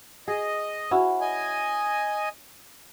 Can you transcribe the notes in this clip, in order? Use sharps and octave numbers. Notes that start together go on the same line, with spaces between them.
G#4 D#5
C#4 E4 F#4
D#5 G#5